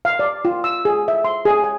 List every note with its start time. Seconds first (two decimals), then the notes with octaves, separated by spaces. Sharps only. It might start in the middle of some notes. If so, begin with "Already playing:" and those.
0.05 F5
0.19 D5
0.45 F4
0.64 E6
0.85 G#4
1.08 E5
1.25 C6
1.45 G#4
1.64 G#5